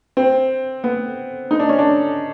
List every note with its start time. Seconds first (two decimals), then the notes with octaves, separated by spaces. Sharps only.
0.17 C4
0.84 B3
1.51 D#4
1.60 D4
1.69 C#4
1.79 D4